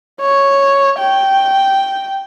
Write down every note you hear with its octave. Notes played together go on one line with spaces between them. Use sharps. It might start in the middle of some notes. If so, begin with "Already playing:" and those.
C#5
G5